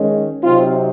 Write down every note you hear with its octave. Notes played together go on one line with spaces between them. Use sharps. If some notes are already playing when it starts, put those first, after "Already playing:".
Already playing: D#3 G#3 C#4
C3 F#3 C4 D#4 F4